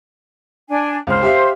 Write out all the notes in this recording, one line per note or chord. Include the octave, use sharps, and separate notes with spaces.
D4 G#5
C#2 C5 F6
G4 E5 F5